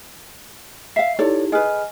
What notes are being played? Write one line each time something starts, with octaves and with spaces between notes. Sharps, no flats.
E5 F5 C7
D#4 E4 G4 A4 C#5 D5
G#4 B4 D#5 G#5 F6